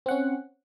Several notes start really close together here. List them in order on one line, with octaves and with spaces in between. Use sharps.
C4 F#5 C#4